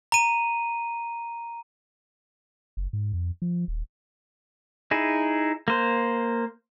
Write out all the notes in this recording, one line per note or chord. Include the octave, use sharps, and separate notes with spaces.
A#5 D#7
F#1
G#2
F2
F3
D#1
D#4 E4 G#4
A#3 C5